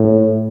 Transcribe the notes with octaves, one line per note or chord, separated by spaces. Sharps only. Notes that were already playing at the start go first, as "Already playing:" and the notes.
Already playing: A2